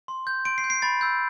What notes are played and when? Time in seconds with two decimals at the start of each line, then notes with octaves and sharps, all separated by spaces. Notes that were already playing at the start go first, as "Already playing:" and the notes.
0.08 C6
0.27 G6
0.45 C6 D7
0.58 C7
0.64 G6
0.70 C7
0.82 B5 A6
1.01 E6 G6